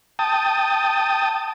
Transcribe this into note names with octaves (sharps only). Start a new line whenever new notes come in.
G5 A5 D#6